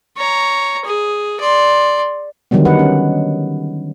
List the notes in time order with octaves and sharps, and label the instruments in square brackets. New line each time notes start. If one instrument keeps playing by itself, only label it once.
[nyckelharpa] C#5 A#5
G#4
D5 C6
[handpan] D3 D#3 F#3 G3 B3
D#4 B4 F#5
C#4